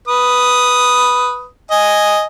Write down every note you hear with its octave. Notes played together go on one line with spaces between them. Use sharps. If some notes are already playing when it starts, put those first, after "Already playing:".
B4 D#6
D#5 G#5